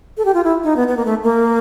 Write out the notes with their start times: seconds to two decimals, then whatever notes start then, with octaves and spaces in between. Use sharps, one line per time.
0.18 A4
0.25 G4
0.34 F4
0.44 E4
0.64 D#4
0.77 B3
0.88 B3
0.97 A#3
1.05 A3
1.23 A#3